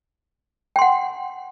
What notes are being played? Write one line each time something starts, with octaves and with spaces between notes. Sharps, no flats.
F#5 G5 C6